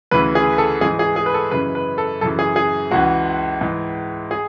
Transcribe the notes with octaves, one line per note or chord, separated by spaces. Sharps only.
D2 C#3 E3 B4
G#4
A4
G#2 E3 G#4
G#4
G#4
B4
A4
F#2 C#3 E3 B4
B4
A4
F#2 C#3 E3 A4
G#4
G#4
C#2 C#3 E3 F#4
G#2 E3
G#4